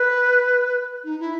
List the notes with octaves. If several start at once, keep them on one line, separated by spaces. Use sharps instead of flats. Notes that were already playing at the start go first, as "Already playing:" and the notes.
Already playing: B4
D#4
E4